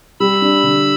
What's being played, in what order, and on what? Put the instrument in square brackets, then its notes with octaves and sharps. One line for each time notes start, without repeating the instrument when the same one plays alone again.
[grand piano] G3 [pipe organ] B5 E6
[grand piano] D4
D3